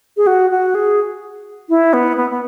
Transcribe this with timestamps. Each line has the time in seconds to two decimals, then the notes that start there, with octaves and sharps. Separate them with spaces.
0.17 G#4
0.27 F#4
0.51 F#4
0.75 G#4
1.69 E4
1.93 B3
2.17 B3
2.30 B3